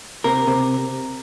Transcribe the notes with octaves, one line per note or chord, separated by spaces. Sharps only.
C3 A#4
C3